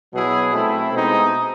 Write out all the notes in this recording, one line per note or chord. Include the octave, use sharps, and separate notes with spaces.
B2 F#3 B3 E4 G#4
A3 C4 E4
B2 G#3 C4 D#4